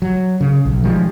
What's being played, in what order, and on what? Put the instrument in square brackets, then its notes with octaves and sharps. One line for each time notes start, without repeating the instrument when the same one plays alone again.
[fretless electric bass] F#3
C#3
B1
D#3 F3 G3 G#3